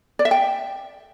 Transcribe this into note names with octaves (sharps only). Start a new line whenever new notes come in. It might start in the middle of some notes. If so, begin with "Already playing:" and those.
D5
E5
G5